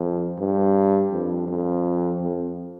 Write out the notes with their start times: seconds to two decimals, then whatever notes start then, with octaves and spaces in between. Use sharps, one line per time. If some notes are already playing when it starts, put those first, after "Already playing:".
Already playing: F2
0.39 G2
1.12 F2
1.49 F2
2.21 F2